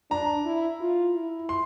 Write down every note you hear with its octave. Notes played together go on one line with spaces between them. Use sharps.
D4 A#5
E4
F4
E4
C6